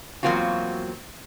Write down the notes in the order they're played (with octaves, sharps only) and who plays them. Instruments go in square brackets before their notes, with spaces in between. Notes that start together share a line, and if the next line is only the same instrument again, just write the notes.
[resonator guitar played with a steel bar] E2 F#3 A#3 C4 F4 F#4